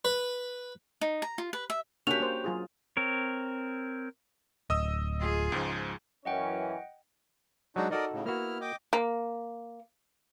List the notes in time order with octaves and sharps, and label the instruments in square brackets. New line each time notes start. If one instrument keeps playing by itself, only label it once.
[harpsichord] B4
[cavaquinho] D#4
A#5
F4
B4
E5
[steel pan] A#3 C#4 D4 [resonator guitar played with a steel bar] F#4 G4 [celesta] F7
[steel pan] A#3 C5
F#3 F4 G#4
[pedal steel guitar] C4 A#4 C#5
[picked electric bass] D1 [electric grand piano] D#5 D#6 E6
[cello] F4 G#4
[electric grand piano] C#2 G#2 F3
[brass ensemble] F#2 E3 C#4 [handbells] D#5 F#5 G5
[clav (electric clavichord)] F#3 G#3 [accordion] D4 D#4 F#4
[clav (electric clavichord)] D#4 F#4 A4 [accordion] A#4 D5 D#5
[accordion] A2 C#3
[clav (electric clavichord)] A#3 F#4 [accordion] B3 E4 F6
[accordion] D#5 G5 D6
[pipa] A#3